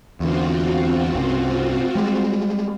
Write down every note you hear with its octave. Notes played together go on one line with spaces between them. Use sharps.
E2 D3 C4 F4 F#4
C2 G2 C#3
G3 G#3